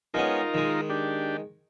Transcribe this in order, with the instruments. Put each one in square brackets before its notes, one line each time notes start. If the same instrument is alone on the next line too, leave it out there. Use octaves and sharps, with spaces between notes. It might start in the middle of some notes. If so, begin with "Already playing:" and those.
[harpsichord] G#3 B3 C#4 [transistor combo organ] D#4 F4 A#4
[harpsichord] D#3 G#3
[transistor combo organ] D4 G4